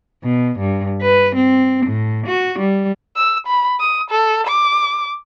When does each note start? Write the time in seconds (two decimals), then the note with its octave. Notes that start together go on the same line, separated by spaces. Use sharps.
0.24 B2
0.59 G2
1.02 B4
1.36 C4
1.86 A2
2.27 F#4
2.59 G3
3.16 E6
3.47 B5
3.80 D#6
4.10 A4
4.48 D6